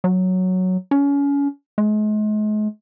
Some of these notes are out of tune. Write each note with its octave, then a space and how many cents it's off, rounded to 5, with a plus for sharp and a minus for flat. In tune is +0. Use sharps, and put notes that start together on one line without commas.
F#3 +0
C#4 +30
G#3 +40